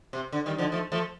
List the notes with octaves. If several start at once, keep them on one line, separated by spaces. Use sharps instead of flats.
C3
D3
D#3 G3
D3 F3
F3 A3
F3 A3